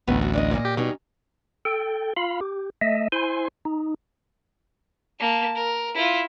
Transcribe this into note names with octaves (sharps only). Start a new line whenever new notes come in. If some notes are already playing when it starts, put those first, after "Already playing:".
A1 D2 D#3 B3
F#4
D4 D5 D#5
A#2 A#3 D#5
G4
B2 G3 C#4 D#4
A4 G5
F4 F5 B5
G4
A3 D#5 E5
E4 C5 G#5 C6
D#4
A#3 A5
A#4
E4 F4